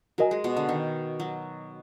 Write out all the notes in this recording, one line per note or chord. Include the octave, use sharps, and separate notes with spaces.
F#3 F#4 A#4 D#5 G#5
G#3
B2
D3
D#3
F#3